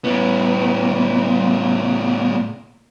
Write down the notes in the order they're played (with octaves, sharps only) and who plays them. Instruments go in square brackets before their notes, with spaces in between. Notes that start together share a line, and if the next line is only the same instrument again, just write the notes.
[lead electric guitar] A2 B3